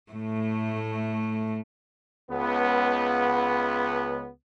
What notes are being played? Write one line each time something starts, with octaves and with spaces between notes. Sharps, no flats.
A2 A3
C#2 B3